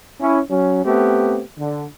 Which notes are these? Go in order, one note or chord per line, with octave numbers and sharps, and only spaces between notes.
C#4 E4
F#3 C#4
A3 B3 C4 G4
D3